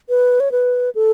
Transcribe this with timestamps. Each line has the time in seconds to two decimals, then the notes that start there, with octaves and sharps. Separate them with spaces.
0.09 B4
0.40 C#5
0.52 B4
0.95 A4